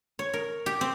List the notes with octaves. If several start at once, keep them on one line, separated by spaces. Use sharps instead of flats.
C#5
A#4
G4
C4